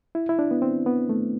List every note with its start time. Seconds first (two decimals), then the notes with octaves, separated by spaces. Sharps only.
0.15 E4
0.29 E4
0.39 D4
0.51 B3
0.62 C4
0.86 B3
1.09 A3